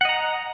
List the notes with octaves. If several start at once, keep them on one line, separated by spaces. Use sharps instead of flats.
D#5 F#5 A#5